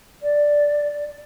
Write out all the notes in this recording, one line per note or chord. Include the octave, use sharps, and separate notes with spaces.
D5